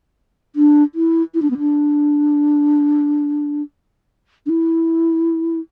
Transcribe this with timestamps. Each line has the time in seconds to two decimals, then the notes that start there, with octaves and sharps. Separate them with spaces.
0.56 D4
0.95 E4
1.34 E4
1.42 D4
1.50 B3
1.59 D4
4.46 D4
4.49 E4